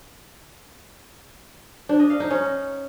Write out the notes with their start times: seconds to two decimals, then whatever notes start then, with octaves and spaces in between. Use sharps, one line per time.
1.89 D4
2.00 D#5
2.10 F5
2.20 D#4
2.30 C#4